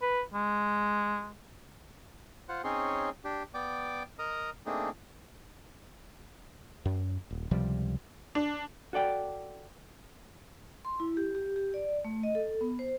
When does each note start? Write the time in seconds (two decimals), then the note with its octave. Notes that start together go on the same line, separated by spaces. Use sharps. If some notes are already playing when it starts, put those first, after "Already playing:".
0.02 B4
0.34 G#3
2.49 F4 C5 F#5
2.64 C4 C#4 D#4 G#4 C#5 C6
3.25 D4 G4
3.54 B3 D5 G5 D6
4.19 A#4 D#5 A#5 D#6
4.66 A3 A#3 C4 D4 D#4 G#4
6.85 F#2
7.31 D#1
7.51 C#2 C3 F3 G3
8.35 D4
8.93 F#4 A4 D5 G5
10.85 C6
11.00 E4
11.17 G4
11.35 G4
11.56 G4
11.74 D5
12.05 A3
12.23 D#5
12.35 A4
12.61 B3
12.79 C5